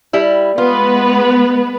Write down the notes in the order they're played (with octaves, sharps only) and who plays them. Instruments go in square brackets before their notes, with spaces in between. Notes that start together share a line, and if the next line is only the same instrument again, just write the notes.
[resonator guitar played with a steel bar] G3 E4
[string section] G#3 B3 B4 [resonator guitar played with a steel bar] F4